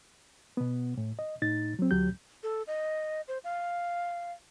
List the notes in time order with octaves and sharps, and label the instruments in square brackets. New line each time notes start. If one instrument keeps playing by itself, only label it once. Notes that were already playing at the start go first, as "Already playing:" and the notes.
[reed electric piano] B2 B3
A2
D#5
A2 D#4 A6
F#3 C4
D2 F#3 G4 G6
[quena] A4
D#5
C5
F5